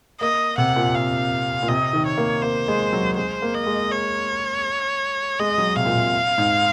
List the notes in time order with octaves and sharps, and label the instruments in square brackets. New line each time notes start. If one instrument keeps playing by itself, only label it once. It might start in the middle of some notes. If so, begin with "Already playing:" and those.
[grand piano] A#3 [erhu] D#5
[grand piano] C3 [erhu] F#5
[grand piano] A#2
[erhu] F5
[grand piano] A#2
[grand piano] C3 [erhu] D#5
[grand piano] D#3
[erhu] C#5
[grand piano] A#3
[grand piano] A#3 [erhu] C5
[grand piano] G#3
F#3
[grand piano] G#3 [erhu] C5
[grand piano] A#3
[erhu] D#5
[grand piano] G#3
[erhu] C#5
[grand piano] G#3 [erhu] D#5
[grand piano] F#3
[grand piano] C3 [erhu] F5
[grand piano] A#2
C3
G#2